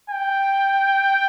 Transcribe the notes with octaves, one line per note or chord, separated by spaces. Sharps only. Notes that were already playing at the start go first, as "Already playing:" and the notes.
G5